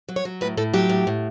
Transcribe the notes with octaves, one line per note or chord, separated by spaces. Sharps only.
F#3
C#5
F#3
A2 B4
A2 A4
F#3 G4
A2
A2